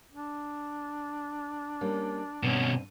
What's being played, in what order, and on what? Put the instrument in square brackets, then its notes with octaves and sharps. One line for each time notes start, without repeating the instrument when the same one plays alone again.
[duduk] D4
[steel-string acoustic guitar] G3 A#3 C#4
[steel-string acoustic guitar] G2 C4 [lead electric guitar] B2 C#4